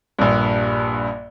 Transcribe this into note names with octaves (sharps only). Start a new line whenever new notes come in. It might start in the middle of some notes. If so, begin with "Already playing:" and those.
A#1 G2